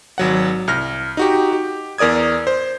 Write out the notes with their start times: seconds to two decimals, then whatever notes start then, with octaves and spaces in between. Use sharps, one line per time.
0.18 G#1 F#3 F#5
0.68 C2 F6 A#6
1.17 D#4 F#4 G4
1.53 G4
1.98 E2 A#4 D5 D#6 G#6
2.47 C5